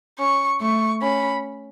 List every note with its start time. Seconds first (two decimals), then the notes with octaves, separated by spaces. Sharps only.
0.19 C#4 C#6
0.61 A3 C#6
1.02 C#4 B5